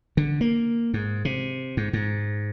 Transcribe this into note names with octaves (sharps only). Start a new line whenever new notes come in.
D3
A#3
G#2
C3
G#2
G#2